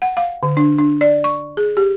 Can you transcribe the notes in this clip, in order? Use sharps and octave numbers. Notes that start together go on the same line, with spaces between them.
F#5
F5
D3
D4
D4
D5
C#6
G#4
G4